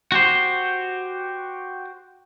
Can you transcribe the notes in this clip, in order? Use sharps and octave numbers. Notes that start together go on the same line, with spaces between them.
F#4 G4 C5